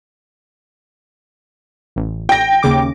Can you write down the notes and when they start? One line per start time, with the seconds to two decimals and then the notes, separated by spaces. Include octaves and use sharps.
1.96 A1
2.29 G5 A#6
2.63 D#2 C#3 D6